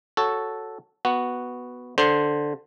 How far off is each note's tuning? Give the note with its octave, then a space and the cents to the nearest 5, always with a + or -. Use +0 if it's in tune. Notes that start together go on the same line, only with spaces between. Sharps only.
F#4 +0 A4 +0 C#5 +0
B3 +0 F#4 +0
D3 +0 C5 +5